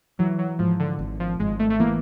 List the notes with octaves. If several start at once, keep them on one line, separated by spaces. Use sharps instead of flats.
E3 F#3
F#3
G#2 F3
D3
G#1
F3
G#1 G#3
A3
A3
E3 A#3